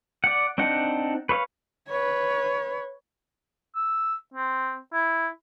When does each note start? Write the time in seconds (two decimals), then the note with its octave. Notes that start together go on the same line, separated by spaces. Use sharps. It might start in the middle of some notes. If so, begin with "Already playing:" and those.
0.24 D5 F#5
0.58 C4 D4 D#4 F#5
1.29 B4 C#5 E5 F5
1.88 B4 C#5
3.76 E6
4.34 C4
4.93 E4